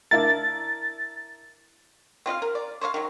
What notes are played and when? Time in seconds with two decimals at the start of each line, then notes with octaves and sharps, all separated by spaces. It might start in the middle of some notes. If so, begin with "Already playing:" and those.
0.11 D4 E4 A#4 A6
2.26 C4 F4 D#5 F5
2.42 A#4
2.55 D5
2.81 C5 C#5 D#5 F5
2.94 D#3 F#3